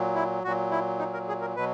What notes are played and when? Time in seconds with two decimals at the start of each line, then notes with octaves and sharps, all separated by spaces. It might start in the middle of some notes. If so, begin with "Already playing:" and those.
Already playing: A#2 F#3
0.15 E4
0.44 A#2 F#3 F#4
0.71 E4
0.99 D#4
1.14 A#4
1.28 G#4
1.41 A#4
1.56 B2 F#3 B4